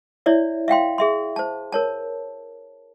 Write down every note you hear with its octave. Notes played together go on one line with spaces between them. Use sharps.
E4 C#5 D5 E5
E5 F5 G5 C6
G#4 E5 C6
C5 A5
A#4 C#5 A5